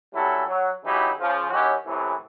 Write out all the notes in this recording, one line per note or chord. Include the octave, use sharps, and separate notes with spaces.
C3 F#3 G3 C#4 E4 A4
F#3
C#3 E3 F#3 D#4 E4 G4
C#3 F3
D#3 F#3 C#4 E4 F#4 G4
F#2 A2 C3 E3